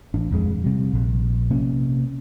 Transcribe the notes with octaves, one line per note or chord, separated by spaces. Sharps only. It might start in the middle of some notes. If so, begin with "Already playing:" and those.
A1 D4
D#1 F2 G#3
C3 G3
A#1
C3 A#3 C#4